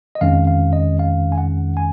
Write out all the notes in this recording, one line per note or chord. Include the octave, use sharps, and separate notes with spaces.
D#5
F2 D#3 G#3 C#4 F5
F5
D#5
F5
G#5
F#5
G#5